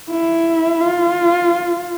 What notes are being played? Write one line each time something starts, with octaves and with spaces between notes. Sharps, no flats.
E4
F4